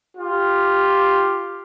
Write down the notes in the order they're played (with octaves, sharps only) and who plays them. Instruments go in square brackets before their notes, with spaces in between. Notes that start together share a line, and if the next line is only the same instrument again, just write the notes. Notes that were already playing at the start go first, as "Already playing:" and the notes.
[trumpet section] F4 G4